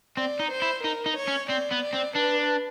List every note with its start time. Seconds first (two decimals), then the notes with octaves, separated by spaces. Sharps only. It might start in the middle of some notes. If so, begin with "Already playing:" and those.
0.17 C4 D5
0.40 D#4
0.51 C5
0.62 E4
0.83 D#4 A#4
1.06 D#4
1.16 C#5
1.28 C#4
1.50 C4 D5
1.72 B3
1.82 D5
1.94 C4
2.16 D4 B4